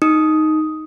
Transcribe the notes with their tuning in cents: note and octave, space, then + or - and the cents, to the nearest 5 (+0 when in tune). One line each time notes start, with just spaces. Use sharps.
D#4 +0 D#6 +5